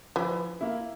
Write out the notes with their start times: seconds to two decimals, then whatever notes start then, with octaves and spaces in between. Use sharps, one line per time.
0.16 E3 F3
0.61 A#3 E4